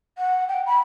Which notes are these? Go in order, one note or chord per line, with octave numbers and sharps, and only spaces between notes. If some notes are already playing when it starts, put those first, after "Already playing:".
F#5
G5
B5